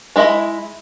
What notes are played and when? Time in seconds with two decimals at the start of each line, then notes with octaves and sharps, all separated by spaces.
0.16 G#3 E4 D#5 E5 B5